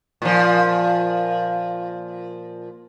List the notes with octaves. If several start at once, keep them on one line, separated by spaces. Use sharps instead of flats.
A#2 F3